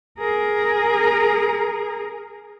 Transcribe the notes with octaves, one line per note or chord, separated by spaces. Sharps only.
G#4 A#4